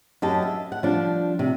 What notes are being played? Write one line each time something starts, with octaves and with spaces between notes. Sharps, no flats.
F#2 G4 D#5 A5
E5
F#5
F3 G3 D4
C3